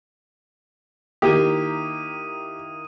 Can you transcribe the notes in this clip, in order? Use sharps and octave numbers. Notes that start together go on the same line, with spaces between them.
D#3 A#3 E4 G4 D#6 D#7